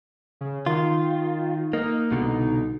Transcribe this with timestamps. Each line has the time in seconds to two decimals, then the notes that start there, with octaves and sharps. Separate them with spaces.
0.41 C#3
0.66 D#3 F4
1.73 A#3 D#4
2.11 C2 B2 D3